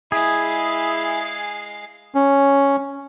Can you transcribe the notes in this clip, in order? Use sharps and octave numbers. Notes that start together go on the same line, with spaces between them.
G#3 E4 G#4 F5
C#4